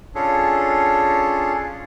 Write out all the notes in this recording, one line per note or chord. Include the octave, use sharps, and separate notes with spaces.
C#4 D4 F4 G#4 A4 C#5